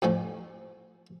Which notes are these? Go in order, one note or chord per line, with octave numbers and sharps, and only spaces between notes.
F2 A2 F3 C#4